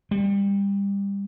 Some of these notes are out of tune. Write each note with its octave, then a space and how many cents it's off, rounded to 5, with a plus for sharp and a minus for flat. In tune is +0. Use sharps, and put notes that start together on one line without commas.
G3 +25